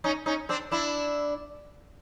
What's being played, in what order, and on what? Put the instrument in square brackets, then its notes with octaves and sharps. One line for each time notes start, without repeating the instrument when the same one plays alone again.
[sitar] C#4 D#4
C#4 D#4
C4 D4
D4 E4